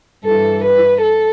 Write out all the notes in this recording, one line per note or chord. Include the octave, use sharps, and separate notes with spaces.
G2 E3 A4
B4
A4